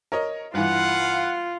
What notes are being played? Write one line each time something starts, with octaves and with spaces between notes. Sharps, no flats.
A#4 C#5 D#5
G2 E3 F4 B4 F5 F#5